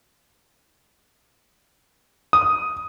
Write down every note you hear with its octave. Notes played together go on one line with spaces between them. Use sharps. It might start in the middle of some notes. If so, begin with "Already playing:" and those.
D#6